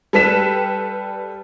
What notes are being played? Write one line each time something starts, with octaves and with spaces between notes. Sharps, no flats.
G3 A4 B4 B6 E7